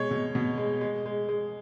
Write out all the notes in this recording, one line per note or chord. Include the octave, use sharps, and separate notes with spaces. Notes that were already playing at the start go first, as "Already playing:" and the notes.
Already playing: B2 G#3 C#5
B2
B2
G#3
G#3
G#3
G#3